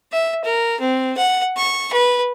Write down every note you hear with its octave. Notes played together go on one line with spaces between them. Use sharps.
E5
A#4
C4
F#5
C#6
B4